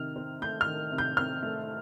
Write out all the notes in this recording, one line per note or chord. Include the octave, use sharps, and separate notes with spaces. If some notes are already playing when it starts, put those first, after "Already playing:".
Already playing: C3 D#3 F6
C4
A3 G6
F6
D#3
C3
G6
C4 F6
A3